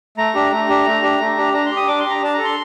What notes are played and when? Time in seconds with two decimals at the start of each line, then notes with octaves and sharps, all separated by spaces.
0.18 A3 A#5
0.35 D4 G4
0.52 A3 A#5
0.69 D4 G4
0.86 A3
1.02 D4 G4
1.21 A3
1.37 D4 G4
1.53 D4 A#5
1.66 G4 C6
1.77 D#6
1.87 D4 D6
1.99 C6
2.05 G4
2.10 A#5
2.22 D4 A5
2.34 A4 A#5
2.45 C6